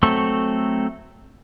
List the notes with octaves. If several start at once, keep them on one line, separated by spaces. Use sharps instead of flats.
F#3 A3 C4 A4 C#6